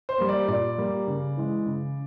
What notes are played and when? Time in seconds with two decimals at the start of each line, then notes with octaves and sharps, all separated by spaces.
0.09 C5
0.18 G3 A#3
0.29 D5
0.48 A#2 D5
0.78 G3 A#3
1.07 C#3
1.37 E3 G#3
1.66 C#3